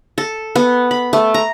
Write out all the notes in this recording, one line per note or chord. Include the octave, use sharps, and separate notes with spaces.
A4
B3
B5
A3
A#5